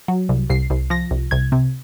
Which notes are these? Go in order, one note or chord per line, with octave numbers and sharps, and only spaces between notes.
F#3
C2
C2 C7
C2
F3 A#6
C2
C2 G#6
C3